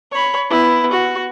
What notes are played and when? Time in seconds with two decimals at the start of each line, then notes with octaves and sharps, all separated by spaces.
0.11 C#5 B5
0.50 B3 E4
0.91 F#4